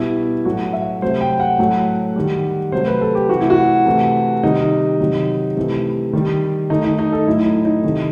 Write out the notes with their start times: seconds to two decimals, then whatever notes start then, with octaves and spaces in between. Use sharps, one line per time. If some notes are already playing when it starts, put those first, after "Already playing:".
Already playing: B2 G3 E4
0.45 A2 F#3 A3 F#4
0.73 E5
1.02 C3 F#3 A3 C5
1.21 G5
1.40 F#5
1.59 A2 F#3 A3
2.16 D#3 G3
2.72 C3 F#3 A3 C5
2.87 B4
3.01 A4
3.15 G4
3.29 C3 E3 A3 F#4
3.40 E4
3.50 F#4
3.86 C3 E3 A3
4.43 C3 D#3 G3 D#4
5.00 C3 D#3 F#3
5.56 C3 E3 A3
6.13 D#3 G3
6.70 D#3 A3 D#4
6.84 D#4
6.99 D#4
7.12 A4
7.27 A2 F#3 A3 E4
7.46 D#4
7.65 D#4
7.84 C3 D#3 A3